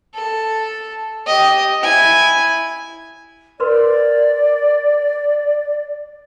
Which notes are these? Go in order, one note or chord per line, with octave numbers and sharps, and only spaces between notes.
A4
G4 D#5
E4 G#5
A#4 B4 D5 C6